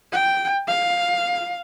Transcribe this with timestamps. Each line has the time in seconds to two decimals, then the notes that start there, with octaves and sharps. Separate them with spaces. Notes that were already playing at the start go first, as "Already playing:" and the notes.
0.12 G5
0.67 F5